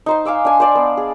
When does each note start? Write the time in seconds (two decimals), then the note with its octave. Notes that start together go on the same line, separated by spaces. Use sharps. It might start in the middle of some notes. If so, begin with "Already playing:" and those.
0.06 D#4 C5 C6
0.25 F5 G#5 D6 E6
0.45 D4 G#5
0.60 C5 D5 A5
0.75 B3
0.97 G#4